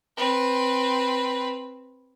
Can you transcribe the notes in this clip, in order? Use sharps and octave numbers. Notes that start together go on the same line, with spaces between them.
C4 B4